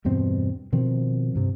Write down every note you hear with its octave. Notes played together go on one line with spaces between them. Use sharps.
E2 G2 B2 C4
B2 D#3 F3 C4
G2 C3